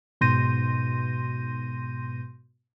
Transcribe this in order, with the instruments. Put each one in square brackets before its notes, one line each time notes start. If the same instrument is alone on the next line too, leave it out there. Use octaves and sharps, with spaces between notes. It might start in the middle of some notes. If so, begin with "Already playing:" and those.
[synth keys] G#2 B2 C6 G6 A#6 D#7